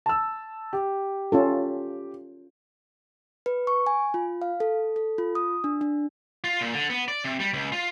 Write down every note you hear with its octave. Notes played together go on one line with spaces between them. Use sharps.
A5 E6
G4
C#4 F4 A4
B4
C#6
G#5
F4
F5
A4
A4
F4
D#6
D4
D4
F4
A#2
D3
B3
D5
C3
G3
C#2
F4